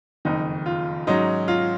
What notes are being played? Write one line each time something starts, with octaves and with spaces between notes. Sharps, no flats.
F#1 F2 D#3 D#4
F4
G#2 F#3 C#4 D#4
F4